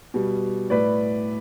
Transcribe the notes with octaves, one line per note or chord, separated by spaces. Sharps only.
B2 G3
A2 B4 D5